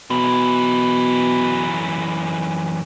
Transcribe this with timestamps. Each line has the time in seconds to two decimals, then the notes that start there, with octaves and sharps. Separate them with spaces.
0.10 F#2 B2 E3